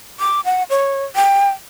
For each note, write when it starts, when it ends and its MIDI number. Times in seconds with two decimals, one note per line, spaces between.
0.20 0.41 86
0.45 0.63 78
0.70 1.06 73
1.16 1.49 79